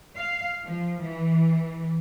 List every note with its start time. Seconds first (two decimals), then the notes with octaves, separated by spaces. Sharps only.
0.17 F5
0.65 F3
1.02 E3